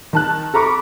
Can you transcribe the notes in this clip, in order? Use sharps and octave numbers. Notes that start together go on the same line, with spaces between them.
D#3 A5 F#6
A4 A#5 B5 C#6 D6